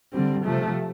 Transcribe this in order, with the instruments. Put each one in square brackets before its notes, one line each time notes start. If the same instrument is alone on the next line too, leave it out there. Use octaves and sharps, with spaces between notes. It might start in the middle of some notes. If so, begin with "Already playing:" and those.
[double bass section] D3 G3 [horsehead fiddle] C4
[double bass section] C3 F3 [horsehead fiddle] A3